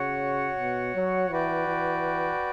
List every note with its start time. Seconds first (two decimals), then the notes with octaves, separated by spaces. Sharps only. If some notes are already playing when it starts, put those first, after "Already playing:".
Already playing: C#3 F#4 C#5 F#5
0.59 B2
0.95 F#3
1.31 E3 F#4 B4 D5 G5
1.67 E3